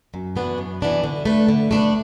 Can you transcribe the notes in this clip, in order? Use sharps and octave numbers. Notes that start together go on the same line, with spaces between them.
F#2
E3 B3 D4 F#4
F#2
E3 B3 D4 F#4
D3
A3 D4 B4
D3
A3 D4 B4